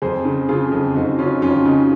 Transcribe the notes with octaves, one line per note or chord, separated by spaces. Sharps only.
F2 G#4 C5
C#3
C#3 F4 G#4
F2
F2 D#4 F#4
C#3 C#4 F4
F2 C#4 F4
C#3 D#4 F#4